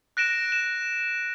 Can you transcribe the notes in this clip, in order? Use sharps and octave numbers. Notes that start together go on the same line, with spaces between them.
F#6 A#6 D7 E7
E7